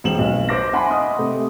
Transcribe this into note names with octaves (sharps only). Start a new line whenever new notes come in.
E1 C4 E7 F#7
B1
C5 D6 A#6
E5 F#5 G#5 A5 B5 C6
D#5 D#6
C3 A3